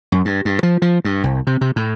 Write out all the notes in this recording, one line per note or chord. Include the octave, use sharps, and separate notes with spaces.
F#2
G2
G2
F3
F3
G2
C2
C3
C3
A2